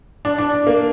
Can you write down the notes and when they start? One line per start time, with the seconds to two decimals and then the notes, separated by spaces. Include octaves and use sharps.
0.25 D4
0.39 D4
0.67 A#3